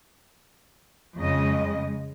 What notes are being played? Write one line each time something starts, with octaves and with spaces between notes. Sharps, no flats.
F2 C#3 G#3 D#5